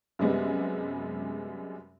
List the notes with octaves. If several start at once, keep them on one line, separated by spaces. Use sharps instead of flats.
F#2 C3 G3 G#3 B3